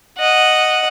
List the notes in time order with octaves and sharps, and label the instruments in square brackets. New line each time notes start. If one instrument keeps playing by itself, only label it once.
[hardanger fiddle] D#5 F#5